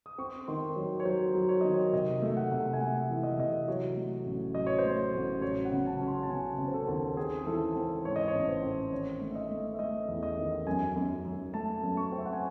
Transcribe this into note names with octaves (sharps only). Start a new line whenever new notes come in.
D#6
C4 C#6
D#3 C6
F#3 C#5
C#5
F#3 C5
F#3
C#5
D#3 D#5
C#5
C3 D#5
A3 E5
F#5
C3
G#5
A3 F#5
E3
D#5
E5
C3 D#5
F#3 C#5
A3
A1
F#3 D#5
C#5
C5
A3
C#5
A1
F#3 C#5
F#5
C#3
A5
C#4
C6
A5
C#3 G#5
C#3
C5
A4
D#2
C4 G#4
E3 A4
C4
G#2 C#5
D#5
C#5
A1
C5
C4
D#3 C#5
A3
E5
D#5
A3
E5
A3 D#5
E2
D#5
D#3
F#2 G#5
F#2
F#2
A3 A5
F#2
C#6
C4
E5
F#5
G#5